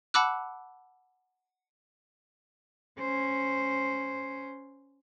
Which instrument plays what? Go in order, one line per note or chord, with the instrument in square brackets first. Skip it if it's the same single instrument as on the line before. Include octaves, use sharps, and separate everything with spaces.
[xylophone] F#5 A5 B5 D6 E6 F#6
[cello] C#4 C5